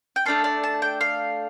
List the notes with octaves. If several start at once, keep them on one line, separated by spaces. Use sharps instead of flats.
G5
A3 D4 A4 F5
D5
A5
G5
F5